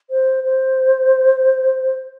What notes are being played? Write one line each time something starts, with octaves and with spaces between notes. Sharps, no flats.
C5
C5